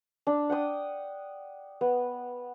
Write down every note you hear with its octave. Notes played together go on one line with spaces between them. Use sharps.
D4
F#5 G5 D#6
B3